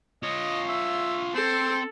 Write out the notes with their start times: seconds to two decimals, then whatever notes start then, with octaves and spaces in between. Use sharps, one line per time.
0.23 F4 C#5 D#5
0.68 E5
1.35 C4 A4 C5